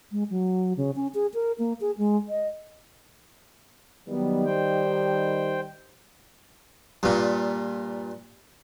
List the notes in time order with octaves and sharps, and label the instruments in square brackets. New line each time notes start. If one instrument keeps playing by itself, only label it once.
[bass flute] G#3
F#3
C#3
C#4
G#4
A#4
A#3
G#4
G#3
D#5
[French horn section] D#3 G3 [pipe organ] F#3 B3
[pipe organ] C5 G5
[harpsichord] G2 A#2